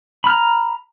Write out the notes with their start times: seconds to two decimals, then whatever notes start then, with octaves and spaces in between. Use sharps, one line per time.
0.24 B5
0.27 F6
0.30 A#5